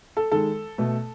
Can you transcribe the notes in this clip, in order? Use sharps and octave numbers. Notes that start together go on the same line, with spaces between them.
A4
D#3 G#3 A4
B2 A3